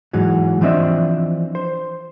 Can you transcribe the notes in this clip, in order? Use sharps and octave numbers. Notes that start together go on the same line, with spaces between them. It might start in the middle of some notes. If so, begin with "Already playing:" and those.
G#2 E3 F#3
E3 F3 C4 D4 D#5 E5
C5